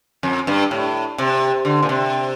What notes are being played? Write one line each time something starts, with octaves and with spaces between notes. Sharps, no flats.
F2
G2
A2
C3
D3
A#2
C3